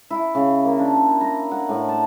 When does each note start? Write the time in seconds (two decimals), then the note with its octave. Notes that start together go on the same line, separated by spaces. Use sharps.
0.10 E4
0.35 C#3
0.65 A#3
0.79 D4
1.21 A#5
1.51 F#5
1.69 A2
1.89 A5